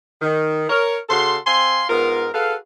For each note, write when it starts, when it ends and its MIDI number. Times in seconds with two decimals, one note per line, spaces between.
0.21 0.65 51
0.69 0.97 70
0.69 0.97 73
1.09 1.37 49
1.09 1.37 66
1.09 1.37 69
1.09 1.37 84
1.46 1.84 60
1.46 1.84 77
1.46 1.84 80
1.46 1.84 84
1.89 2.28 44
1.89 2.28 59
1.89 2.28 65
1.89 2.28 70
2.34 2.55 66
2.34 2.55 68
2.34 2.55 69
2.34 2.55 71
2.34 2.55 77